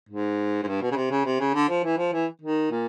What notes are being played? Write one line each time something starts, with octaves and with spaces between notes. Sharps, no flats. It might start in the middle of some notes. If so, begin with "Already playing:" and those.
G#2
G#2
G2
B2
C#3
C3
C#3
C3
C#3
D3
F3
E3
F3
E3
D#3
A#2